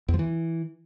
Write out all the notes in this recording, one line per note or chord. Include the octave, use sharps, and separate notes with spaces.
E2
F3
E3